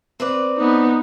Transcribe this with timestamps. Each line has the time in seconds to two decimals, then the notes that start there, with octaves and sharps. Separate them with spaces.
0.20 C4 B4 D5
0.57 B3 D#4